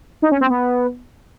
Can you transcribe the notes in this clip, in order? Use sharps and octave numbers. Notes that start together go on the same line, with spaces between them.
D#4
C#4
C4
B3